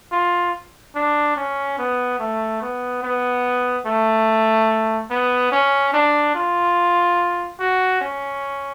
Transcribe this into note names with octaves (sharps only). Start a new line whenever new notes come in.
F4
D4
C#4
B3
A3
B3
B3
A3
B3
C#4
D4
F4
F#4
C#4